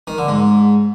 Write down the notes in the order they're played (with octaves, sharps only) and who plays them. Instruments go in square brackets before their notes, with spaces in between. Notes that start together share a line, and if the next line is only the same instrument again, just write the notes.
[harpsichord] D#3
D3
G#2